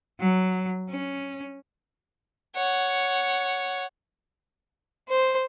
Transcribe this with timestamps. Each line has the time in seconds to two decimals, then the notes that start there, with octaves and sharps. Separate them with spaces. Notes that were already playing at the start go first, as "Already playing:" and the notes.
0.20 F#3
0.90 C#4
2.56 C#5 F#5
5.09 C5